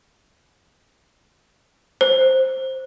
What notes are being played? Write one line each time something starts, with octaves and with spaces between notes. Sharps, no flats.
C5